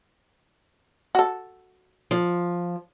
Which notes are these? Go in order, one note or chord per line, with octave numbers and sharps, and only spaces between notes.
F#4 A4
F3